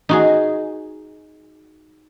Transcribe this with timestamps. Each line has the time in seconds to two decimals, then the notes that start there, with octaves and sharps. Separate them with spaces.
0.09 D#4 F#4 G#4